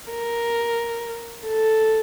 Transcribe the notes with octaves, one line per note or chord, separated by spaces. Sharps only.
A#4
A4